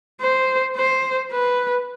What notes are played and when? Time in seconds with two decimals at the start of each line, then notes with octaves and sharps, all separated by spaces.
0.21 C5
0.77 C5
1.32 B4